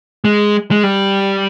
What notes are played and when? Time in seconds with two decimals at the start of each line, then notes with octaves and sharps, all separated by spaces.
0.24 G#3
0.71 G#3
0.83 G3